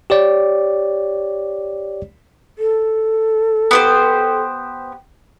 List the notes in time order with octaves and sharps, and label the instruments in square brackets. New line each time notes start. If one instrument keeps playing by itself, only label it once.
[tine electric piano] G4 C#5 D5
[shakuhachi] A4
[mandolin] B3 G4 C5